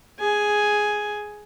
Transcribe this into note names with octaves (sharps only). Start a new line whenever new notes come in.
G#4 G#5